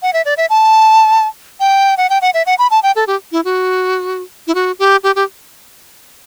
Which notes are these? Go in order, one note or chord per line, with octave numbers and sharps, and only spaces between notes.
F#5
E5
D5
E5
A5
G5
F#5
G5
F#5
E5
F#5
B5
A5
G5
A4
G4
E4
F#4
E4
F#4
G4
G4
G4